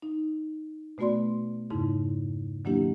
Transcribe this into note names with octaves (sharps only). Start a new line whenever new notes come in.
D#4
B2 A3 B3 F#4 D5 C6
F2 G#2 C#3 D#4 E4
D#3 F#3 A#3 D4 E4 G4